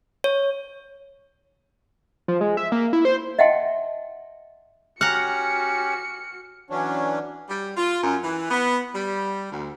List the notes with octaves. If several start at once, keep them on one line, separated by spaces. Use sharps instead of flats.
C#5
F3
G#3
E5
A#3
E4
C5
D#5 E5 F#5 G5 A5 C6
C#4 F#4 G4 F#5 A#5 F6 C#7
E3 F#3 C#4 D4
G3
F4
F#2
E3
B3
G3
D2